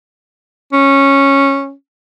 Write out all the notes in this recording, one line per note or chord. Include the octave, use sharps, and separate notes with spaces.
C#4